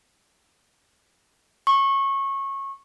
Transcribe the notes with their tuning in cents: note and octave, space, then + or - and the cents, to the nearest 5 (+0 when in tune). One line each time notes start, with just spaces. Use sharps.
C#6 -20